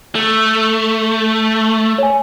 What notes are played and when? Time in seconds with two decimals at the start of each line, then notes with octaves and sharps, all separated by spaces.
0.15 A3
1.98 C#5 G#5